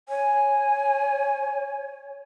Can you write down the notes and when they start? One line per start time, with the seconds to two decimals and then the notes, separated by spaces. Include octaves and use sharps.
0.09 C#5 G#5